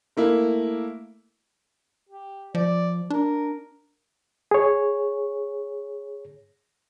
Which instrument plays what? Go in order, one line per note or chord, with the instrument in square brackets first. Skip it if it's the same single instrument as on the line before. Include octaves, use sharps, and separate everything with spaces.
[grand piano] A3 A#3 E4
[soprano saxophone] G4
[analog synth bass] F3 [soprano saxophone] D5
[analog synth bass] D4 [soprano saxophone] A#4
[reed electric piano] G#4 C#5